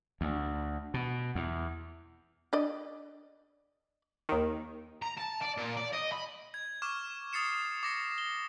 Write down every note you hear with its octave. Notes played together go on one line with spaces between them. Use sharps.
D2
B2
E2
D4 D5 D#5
D#2 D#3
A#5
A5
D5
A#2
D5
D#5
B5
G#6
C#6 D6 F6 E7
D#6 A6 C7 C#7 E7
D6 A#6 C#7
G7